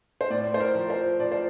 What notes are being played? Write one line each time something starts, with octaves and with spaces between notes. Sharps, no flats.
C5
A2 D5
C5
A#4
F3
C5
F3 D5
C5